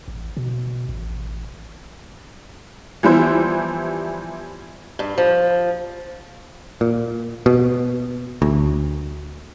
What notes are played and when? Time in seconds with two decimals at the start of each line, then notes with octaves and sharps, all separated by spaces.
0.08 A1
0.37 B2
0.89 A1
3.03 E3 F3 G3 B3 E4 C5
4.99 G2
5.18 F3
6.81 A#2
7.46 B2
8.42 D2